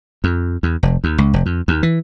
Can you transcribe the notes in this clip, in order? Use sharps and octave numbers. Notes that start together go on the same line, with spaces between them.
F2
E2
F1
D#2
C#2
F1
F2
D#2
E3